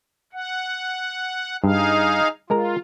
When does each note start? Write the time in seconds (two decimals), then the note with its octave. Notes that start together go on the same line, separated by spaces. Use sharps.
0.33 F#5
1.64 G2 D#4 G#4 F5
2.50 G#3 F4 A#4 A#5